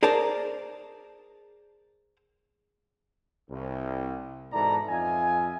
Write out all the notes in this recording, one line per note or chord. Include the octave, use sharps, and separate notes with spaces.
G#4 A#4 C5 D5 A5 A#5
C2
G#2 B2 E3 A4 D5 A#5
F2 F4 D#5 E5 G#5